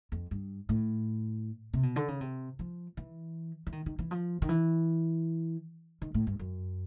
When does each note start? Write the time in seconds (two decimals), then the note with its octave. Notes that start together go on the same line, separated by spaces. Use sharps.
0.12 F2
0.31 G2
0.69 A2
1.73 C3
1.83 B2
1.96 D3
2.08 C#3
2.21 C3
2.59 F3
2.97 E3
3.67 E3
3.72 D#3
3.86 D#3
3.99 E3
4.11 F3
4.42 D#3
4.49 E3
6.02 D#3
6.14 A2
6.27 G2
6.39 F#2